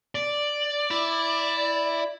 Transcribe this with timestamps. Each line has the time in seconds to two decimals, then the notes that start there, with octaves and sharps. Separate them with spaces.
0.15 D5
0.91 E4